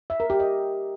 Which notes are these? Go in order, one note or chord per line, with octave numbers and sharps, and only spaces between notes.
E5
A#4
G4
D#5